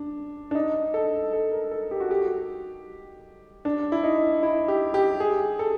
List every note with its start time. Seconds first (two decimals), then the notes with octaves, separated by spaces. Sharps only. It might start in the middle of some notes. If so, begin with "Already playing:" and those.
Already playing: D4
0.51 D4
0.55 D#4
0.94 A4
1.33 A4
1.52 A#4
1.71 A4
1.91 G4
2.00 F#4
2.11 G4
3.65 D4
3.92 E4
4.04 D#4
4.43 E4
4.68 G4
4.94 G4
5.20 G#4
5.59 A4